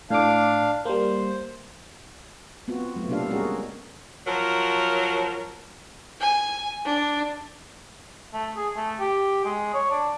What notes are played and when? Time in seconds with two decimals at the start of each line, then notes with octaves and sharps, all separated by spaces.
0.10 A2 D4 F5 D6
0.85 G3 A#3 C5
2.68 B3 C4 F4 F#4
2.96 F#3 A3 B3 F4
3.09 C3 A#3 D4 G4 A4 F5
3.28 G3 G#3 C#4 F#4 G#4 A#4
4.26 F3 F#3 A#4
6.20 G#5
6.85 D4
8.34 A3
8.57 G#4
8.76 A3
9.00 G4
9.45 G#3
9.74 C#5
9.91 D4